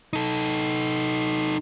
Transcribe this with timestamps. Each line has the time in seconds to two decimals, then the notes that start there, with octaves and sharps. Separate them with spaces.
0.13 D#4 A4